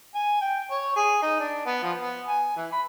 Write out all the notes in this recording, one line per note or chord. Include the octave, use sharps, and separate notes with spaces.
G#5
G5
C#5
G#4
D#4
D4
B3
F3
B3
G#5
E3
B5